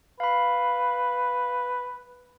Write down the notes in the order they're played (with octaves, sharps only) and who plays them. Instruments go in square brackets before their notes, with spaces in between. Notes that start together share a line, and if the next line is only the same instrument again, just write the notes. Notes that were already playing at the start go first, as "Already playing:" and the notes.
[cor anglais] B4 [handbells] F5 B5